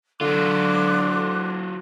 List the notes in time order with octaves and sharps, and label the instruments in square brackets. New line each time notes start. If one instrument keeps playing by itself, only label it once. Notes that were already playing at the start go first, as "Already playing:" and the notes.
[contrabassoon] D3 [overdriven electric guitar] F#3 F4 [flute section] C6 D6 F#6